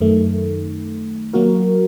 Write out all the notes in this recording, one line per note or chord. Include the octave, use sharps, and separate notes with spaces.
F#2 D#3 A3
F#3 A#3 F#4 A#4